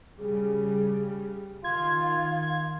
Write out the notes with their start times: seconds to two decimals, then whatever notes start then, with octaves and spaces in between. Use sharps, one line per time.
0.18 C#3 G3 G#4
1.64 D#3 F4 F5 G#6